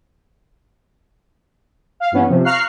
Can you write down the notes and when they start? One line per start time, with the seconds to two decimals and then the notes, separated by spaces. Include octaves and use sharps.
2.00 F5
2.12 G2 E3 B3 C#4
2.29 C3 F3
2.44 F5 A#5 C#6 F6 F#6 C7